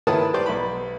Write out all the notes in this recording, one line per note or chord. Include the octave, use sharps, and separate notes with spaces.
D#3 E4 B4 C#5 A5 D#6
G3 G4 B4 C5 D5
B1 B5